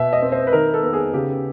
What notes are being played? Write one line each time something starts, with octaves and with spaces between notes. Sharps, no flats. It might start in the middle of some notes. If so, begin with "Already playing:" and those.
Already playing: B2 E5
D#5
C4
C5
B4
D#3 A#4
A4
B3
G#4
C#3 G4